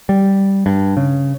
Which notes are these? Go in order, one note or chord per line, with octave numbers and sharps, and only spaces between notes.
G3
G2
C#3